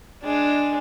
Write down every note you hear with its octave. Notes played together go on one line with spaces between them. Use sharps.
G#3 D4